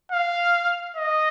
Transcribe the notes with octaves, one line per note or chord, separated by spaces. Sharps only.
F5
D#5